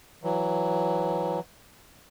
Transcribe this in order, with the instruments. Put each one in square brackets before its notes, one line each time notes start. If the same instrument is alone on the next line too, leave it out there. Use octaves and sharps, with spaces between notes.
[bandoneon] E3 F#3